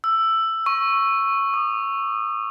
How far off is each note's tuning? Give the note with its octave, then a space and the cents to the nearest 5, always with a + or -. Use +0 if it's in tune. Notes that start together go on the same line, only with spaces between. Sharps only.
E6 +10
C#6 -5
D#6 -40